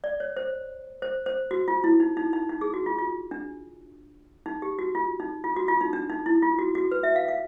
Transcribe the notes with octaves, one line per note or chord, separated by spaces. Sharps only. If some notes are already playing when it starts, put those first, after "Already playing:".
D5
C#5
C5
C5
C5
F#4
F4
E4
D#4
D#4
D#4
D#4
G#4
F#4
F4
F4
D4
D#4
G4
F#4
F4
D#4
F4
F#4
F4
D#4
D4
D#4
E4
F4
F#4
F#4
B4
E5
F5
F5